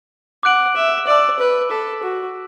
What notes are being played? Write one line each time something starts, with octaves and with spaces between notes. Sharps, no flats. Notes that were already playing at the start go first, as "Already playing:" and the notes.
F#5 D6 F#6 D7 F#7
E5
D5 A5 E6 D7 F#7
B4
A4 D6 B6 E7
F#4